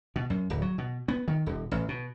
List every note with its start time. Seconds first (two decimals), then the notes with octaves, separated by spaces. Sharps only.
0.16 B2
0.30 F#2
0.50 D1
0.62 F#3
0.78 B2
1.08 B3
1.28 D#3
1.46 D#1
1.71 A1
1.89 B2